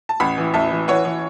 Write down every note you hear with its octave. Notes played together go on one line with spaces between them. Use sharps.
A5
A1 F#5 B5
E3
A1 E5 A5
E3
E3 C#5 F#5
E3